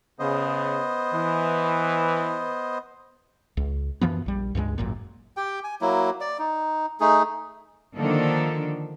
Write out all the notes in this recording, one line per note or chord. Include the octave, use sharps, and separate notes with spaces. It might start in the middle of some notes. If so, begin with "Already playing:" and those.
C#3 B3 C5 D#5
E3
C#2
F#2 E3 F3 B3
A#1 G3
C#2 G2 D#3 G#3
G#1 F#2 A#2
G4 G5
G#5
F#3 A#3 E4
D5
D#4
A3 D#4 G#4
D3 D#3 F3 A#3 D4 A4